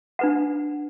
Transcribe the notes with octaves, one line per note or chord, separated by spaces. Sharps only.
D4 B4 F#5